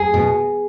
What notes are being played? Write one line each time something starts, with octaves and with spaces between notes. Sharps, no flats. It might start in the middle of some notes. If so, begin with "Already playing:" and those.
Already playing: G#4
B2